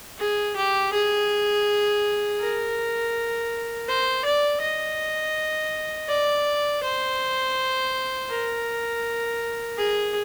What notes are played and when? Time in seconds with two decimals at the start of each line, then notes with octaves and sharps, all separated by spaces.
0.18 G#4
0.56 G4
0.93 G#4
2.40 A#4
3.88 C5
4.25 D5
4.61 D#5
6.09 D5
6.83 C5
8.30 A#4
9.77 G#4